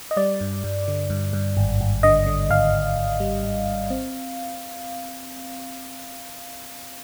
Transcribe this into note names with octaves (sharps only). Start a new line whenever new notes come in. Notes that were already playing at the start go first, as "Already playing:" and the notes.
D#5
G3 D5
G2
G2
D3
G2
G2
G#1
G#1
D3 D#5
D3
G#1 F5
G#1
G#1
G3
G#1
G#1
C4